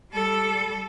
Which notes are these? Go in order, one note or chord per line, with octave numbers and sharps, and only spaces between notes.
G3 A4